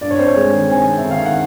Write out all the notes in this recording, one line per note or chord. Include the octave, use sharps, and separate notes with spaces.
G2 D5
C#5
C4 C5
C#5
G#3
D#3
C4 G#5
C4
E5
D#3
F5
D#3 F#5